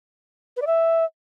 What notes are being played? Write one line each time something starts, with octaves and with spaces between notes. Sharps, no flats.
B4
D5
E5